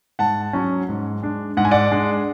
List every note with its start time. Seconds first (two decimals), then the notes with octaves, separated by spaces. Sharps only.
0.19 G#2 F#5 A5
0.53 F#3 C#4
0.89 G#2
1.23 G#3 D4
1.57 G#2 F#5
1.65 G#5
1.71 D5 F#5
1.92 G#3 D4